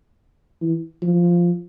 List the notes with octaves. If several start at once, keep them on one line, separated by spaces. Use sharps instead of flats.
E3
F3